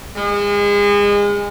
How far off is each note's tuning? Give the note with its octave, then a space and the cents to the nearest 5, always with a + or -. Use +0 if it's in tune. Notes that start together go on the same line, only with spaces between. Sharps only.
G#3 -30